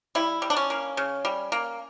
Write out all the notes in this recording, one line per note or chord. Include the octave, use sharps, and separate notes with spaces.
G3 E4
G3
D4
C#4
A#3
C#3
G3
A#3